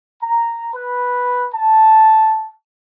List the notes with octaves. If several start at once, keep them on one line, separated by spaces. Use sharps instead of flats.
A#5
B4
A5